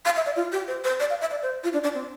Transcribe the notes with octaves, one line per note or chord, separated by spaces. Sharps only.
F5
E5
D5
F4
G4
C5
C5
D5
F5
E5
D5
C5
F4
D4
D4
C4